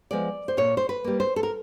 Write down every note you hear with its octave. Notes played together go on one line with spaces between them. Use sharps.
F3 G#3 B3 D5
C5
A#2 C#5
C5
B4
G3 A#3
C5
A4
A#4